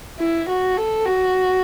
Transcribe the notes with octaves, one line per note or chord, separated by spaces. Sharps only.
E4
F#4
A4
F#4